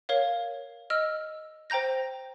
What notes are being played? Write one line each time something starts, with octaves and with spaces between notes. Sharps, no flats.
A#4 C#5 F5
D#5 E6 F6
C5 G5 A#5 G6 A#6